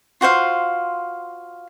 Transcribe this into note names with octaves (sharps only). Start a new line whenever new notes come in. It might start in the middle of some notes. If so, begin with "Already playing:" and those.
F4 F#4 C5 F5